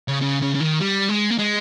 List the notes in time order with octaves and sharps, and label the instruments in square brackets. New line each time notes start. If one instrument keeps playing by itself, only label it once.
[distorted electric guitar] C#3
C#3
C#3
C#3
D#3
G3
G#3
A#3
G#3